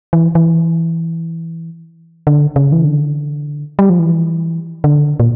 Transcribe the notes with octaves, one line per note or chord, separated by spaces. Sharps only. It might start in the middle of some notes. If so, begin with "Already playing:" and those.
E3
E3
D3
C#3
E3
D3
G3
F3
E3
D3
A#2